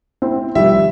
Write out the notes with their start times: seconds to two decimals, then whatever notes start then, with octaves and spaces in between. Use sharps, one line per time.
0.22 C4 E4
0.55 D#3 F3 G3 E5